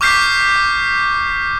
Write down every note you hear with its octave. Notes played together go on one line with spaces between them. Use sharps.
C#6 D6 F6 G6 B6 C7